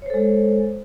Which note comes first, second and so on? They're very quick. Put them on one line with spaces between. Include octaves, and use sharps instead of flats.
C#5 C5 A4 G#3